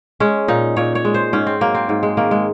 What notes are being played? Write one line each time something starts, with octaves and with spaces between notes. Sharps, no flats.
G#3 C#4
A#2 D#4
A#2 C#5
C#5
G#3
C5
G#2 C#4
C4
F#3 A#3
C4
G#2
G#3
D#3 A#3
G#3